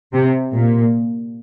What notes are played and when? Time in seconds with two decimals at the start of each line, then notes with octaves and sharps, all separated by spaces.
0.13 C3
0.54 A#2